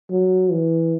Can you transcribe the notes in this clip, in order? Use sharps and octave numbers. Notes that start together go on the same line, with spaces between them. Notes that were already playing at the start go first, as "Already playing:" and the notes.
F#3
E3